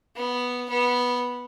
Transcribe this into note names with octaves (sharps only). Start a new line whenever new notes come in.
B3
B3